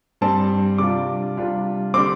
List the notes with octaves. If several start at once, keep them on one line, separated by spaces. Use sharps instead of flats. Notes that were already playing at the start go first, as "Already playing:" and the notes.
G2 G3 C4 A5
C3 G3 D4 F4 D6
C3 G3 D4 F4
D3 G3 C4 D6